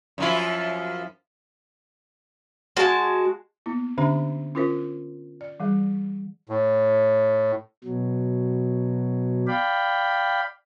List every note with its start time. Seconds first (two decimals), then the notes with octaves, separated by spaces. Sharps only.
0.18 F#2 F3 E4
2.77 G#3 F#4 A5
3.66 A#3 B3 E4
3.98 D3 C#4 D4 G4 E5 A#5
4.55 C#4 E4 F4 A#4 C5
5.41 D5
5.60 E3 G3 G#4
6.49 A2
7.84 B2 F#3
9.47 D5 F5 G5 B5